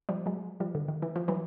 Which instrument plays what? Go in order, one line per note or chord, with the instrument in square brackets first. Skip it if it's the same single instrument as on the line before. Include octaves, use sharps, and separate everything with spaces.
[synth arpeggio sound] F3 G3
F#3 G#3
F3 G3
D3
D#3
E3
F3
E3 F#3